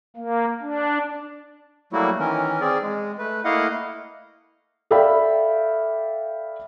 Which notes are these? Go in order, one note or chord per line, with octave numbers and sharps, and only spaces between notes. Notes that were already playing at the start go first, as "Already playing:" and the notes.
A#3
D4
F#3 G3 A3 A#3 E4 F#4
D#3 E3 C#4 A#4
C4 G#4 D5
G#3
A3 B4
A3 A#3 E4 D#5 F5 F#5
A4 D5 E5 F5 G5 B5